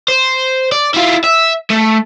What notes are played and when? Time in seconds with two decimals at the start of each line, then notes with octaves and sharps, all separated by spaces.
0.08 C5
0.72 D5
0.94 E4 F4
1.24 E5
1.70 A3